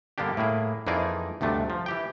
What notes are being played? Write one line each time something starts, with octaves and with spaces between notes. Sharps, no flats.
G2 D3 A#3 B3 D4 G4
A2 A#3 E4 G#4
F2 E3 A#3 D#4 G#4 D5
D2 G2 C3 A3 D4 D#5
F3
E3 G4 G5